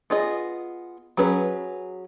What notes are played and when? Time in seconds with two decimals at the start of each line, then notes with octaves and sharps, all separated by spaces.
0.10 B3 F4 G#4 D#5
1.17 F#3 C#4 G#4 B4